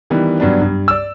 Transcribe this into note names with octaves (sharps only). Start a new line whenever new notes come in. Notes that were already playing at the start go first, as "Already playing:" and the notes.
D#3 E3 G3 B3
G2 F#3 B3 D4
G2
D5 E6